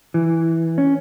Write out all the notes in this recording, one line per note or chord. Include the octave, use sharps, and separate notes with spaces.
E3
C#4